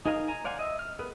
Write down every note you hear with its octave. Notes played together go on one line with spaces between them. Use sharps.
D#4 G#4 A#4 D#5 F5
G#5 A#5
C5 D5 F5 F#5 G#5
D#5 E5
F6
B3 G#4 A#4 B4